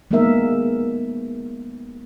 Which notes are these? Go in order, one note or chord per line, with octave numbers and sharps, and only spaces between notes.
G#3 A#3 B3 D#4 A#4 E5